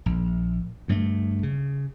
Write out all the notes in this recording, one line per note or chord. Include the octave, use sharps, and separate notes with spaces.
A#1
D2 G2 G3 A3
C#3